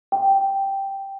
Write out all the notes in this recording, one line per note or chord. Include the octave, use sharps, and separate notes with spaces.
G5